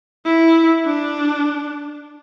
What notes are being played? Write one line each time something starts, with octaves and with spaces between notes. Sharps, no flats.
E4
D4